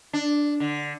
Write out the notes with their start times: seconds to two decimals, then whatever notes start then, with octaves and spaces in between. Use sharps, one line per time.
0.13 D4
0.60 D3